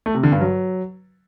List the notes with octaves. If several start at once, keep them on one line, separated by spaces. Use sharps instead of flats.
A3
C3
D3
G2
F#3